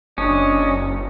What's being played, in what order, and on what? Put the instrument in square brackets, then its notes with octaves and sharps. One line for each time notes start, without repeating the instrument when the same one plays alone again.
[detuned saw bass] F#1 [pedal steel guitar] C#4 [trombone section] D4 [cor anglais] D#5